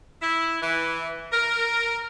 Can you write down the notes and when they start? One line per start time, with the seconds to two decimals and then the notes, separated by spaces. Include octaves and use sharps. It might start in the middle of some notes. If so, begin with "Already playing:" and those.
0.21 E4
0.62 E3
1.32 A#4